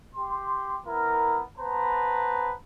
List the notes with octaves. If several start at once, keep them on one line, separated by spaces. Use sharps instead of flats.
G4 C6
B3 E4 A#4
B3 B4 C5 A5 A#5